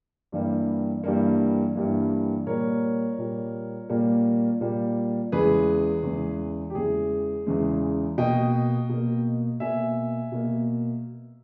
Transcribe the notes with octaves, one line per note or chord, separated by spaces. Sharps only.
G2 E3 G3 A#3
G2 E3 G3 A#3
G2 E3 G3 A#3
A#2 G3 A#3 A#4 C#5
A#2 G3 A#3
A#2 G3 A#3
A#2 G3 A#3
E2 C#3 E3 G#3 G#4 B4
E2 C#3 E3 G#3
G4
E2 C#3 E3 G#3 G#4
E2 C#3 E3 G#3
B2 A#3 D#5 G5
B2 A#3
B2 A#3 E5 G#5
B2 A#3